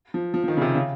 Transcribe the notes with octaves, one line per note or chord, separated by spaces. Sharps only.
F3
F3
F3
D#3
C#3
C3
C#3